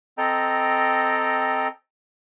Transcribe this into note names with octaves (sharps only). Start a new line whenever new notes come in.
C4 A4 D#5 G5 A#5